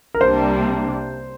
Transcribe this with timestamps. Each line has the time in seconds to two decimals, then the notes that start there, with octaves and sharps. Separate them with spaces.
0.15 A#4
0.21 C2 C3 G3 A#3 D4 C5